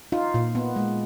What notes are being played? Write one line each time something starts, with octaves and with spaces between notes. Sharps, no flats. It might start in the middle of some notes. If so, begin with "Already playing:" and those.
D#4 F4
A#2
B3
G#3